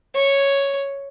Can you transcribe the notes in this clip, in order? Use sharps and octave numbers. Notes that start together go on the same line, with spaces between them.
C#5